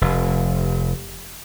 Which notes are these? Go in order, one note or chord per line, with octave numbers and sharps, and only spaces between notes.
F1